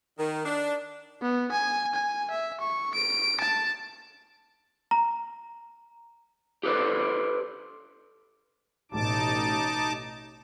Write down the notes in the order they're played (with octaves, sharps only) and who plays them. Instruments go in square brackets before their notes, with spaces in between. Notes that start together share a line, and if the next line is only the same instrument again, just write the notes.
[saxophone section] D#3
D4
[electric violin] B3
G#5
G#5
E5
C#6
D7
A5
[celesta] A#5
[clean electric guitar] G4 A4 B4 C5 D5
[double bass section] A1 B2 [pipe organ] D#4 A5 D6